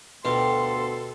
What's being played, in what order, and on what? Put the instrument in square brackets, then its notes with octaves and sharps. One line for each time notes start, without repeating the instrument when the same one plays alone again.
[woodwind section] D2 B3 C6 [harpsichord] B2 [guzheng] F4 G4 [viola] A4